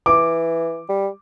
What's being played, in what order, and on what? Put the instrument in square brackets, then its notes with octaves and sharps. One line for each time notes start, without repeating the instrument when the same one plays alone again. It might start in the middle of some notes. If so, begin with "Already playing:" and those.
[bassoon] E3 [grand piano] D6
[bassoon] G3